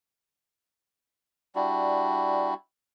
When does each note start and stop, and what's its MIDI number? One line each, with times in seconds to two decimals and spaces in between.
1.55 2.54 55
1.55 2.54 62
1.55 2.54 64
1.55 2.54 66